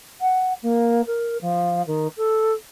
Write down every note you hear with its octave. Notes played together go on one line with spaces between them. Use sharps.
F#5
A#3
A#4
F3
D#3
A4